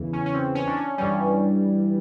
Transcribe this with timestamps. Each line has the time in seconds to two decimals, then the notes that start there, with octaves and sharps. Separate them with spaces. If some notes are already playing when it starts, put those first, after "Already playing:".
Already playing: E2 C#3 E3
0.13 C#4
0.26 C#4
0.34 C4
0.55 C#4
0.67 D4
0.77 C#4
0.98 G2 E3 G3 C#4